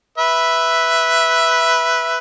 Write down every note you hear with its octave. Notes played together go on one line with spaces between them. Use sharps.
B4 E5